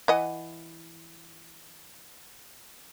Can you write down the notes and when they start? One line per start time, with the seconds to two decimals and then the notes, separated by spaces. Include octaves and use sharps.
0.08 E3 D#5 F#5